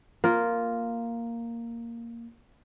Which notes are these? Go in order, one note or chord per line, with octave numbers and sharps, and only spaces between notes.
A#3 F4